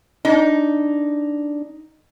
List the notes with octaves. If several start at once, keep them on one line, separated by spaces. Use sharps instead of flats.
D4 D#4